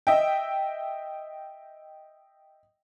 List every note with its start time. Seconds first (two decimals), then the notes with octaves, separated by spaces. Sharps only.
0.07 D#5 E5 G5